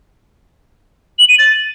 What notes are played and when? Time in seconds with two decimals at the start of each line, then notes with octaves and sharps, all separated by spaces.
1.18 F#7
1.28 D#7
1.38 A6